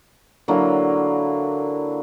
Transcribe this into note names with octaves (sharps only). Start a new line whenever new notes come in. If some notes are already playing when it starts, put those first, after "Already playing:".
D3 F#3 A#3 E4